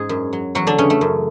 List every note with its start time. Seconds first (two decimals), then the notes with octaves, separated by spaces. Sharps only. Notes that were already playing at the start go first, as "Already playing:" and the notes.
Already playing: G#2 C#4 G#4
0.09 F#2
0.33 F#3
0.55 E2 F#3 F#4
0.67 D3 D4
0.78 C#3 E3 C#4
0.90 A3
1.01 F#2